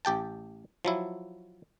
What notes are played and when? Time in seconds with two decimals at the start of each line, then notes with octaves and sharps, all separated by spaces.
0.05 A1 G4 G5 A5
0.85 F3 F#3 E4